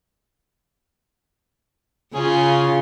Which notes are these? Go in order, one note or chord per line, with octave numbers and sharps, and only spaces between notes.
C#3 C#4 F4 G#4